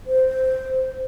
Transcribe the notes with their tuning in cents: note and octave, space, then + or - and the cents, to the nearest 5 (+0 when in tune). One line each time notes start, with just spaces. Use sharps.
C5 -10